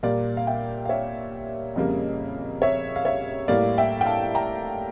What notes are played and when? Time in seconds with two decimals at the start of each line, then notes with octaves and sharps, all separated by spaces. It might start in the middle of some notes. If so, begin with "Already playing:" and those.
0.03 A#2 G3 A#3 D5 F5
0.37 F5
0.47 E5 G5
0.85 F5
0.89 C#5 E5
1.76 F2 C#3 G3 A#3
2.62 C#5 E5
2.96 F5
3.05 C#5 E5
3.48 A2 G3 A#3 D5 F5
3.78 E5 G5
4.01 G5
4.06 F5 A5
4.35 G5 A#5